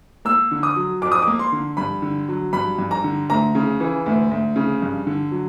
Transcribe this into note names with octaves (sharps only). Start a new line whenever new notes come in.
A#3 E6
D3
D#6
F#3
F2 D6
D#6
D6
A#3
C6
D3
G2 B5
D3
F#3
G2 B5
G2
A#5
D3
D2 A#5
C#3
E3
D2
D2
C#3
G2
D3
F#3